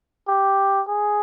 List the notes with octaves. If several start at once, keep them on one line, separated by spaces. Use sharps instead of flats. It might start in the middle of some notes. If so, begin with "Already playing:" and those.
G4
G#4